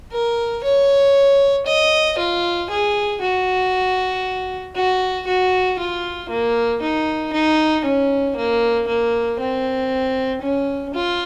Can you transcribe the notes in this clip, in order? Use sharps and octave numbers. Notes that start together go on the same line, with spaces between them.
A#4
C#5
D#5
F4
G#4
F#4
F#4
F#4
F4
A#3
D#4
D#4
C#4
A#3
A#3
C4
C#4
F4